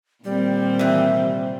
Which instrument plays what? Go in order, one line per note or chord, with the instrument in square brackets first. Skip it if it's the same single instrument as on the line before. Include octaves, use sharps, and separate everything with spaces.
[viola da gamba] A#2 D#3 C4 [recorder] G3
[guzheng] C3 E3